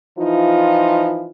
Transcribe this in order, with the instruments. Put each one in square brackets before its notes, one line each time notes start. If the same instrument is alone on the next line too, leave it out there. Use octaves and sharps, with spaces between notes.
[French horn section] E3 F3 D#4 F4